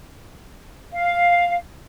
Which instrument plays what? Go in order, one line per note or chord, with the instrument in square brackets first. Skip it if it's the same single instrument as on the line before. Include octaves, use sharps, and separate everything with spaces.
[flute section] F5